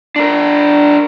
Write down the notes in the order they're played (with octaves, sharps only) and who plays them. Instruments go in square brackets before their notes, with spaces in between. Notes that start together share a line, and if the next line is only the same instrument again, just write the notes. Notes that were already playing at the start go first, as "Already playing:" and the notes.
[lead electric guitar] D4 A#4